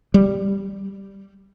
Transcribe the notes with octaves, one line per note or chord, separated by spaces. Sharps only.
G3